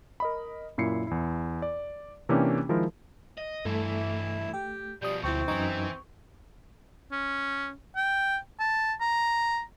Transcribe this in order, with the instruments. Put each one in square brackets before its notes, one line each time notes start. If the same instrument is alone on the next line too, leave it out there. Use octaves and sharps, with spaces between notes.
[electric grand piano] A#4 D#5 B5
F#2 A#2 E4 C7 C#7
E2 E4
D5
C3 E3 A#3 C#4 D4 G4
D#3 F3 G#3 E4 A#4 C5
[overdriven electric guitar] D#5
[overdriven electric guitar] C2 E3 [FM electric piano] G2 [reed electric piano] A3 [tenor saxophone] E4
[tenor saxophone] G4 [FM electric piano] G5
[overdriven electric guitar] B2 F3 [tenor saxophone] G3 [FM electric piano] D#6 G6
[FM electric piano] D2 E4 [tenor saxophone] C4 [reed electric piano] C#6
[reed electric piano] F#2 D#4 [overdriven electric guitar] E3 [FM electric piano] C#6
[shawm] C#4
G5
A5
A#5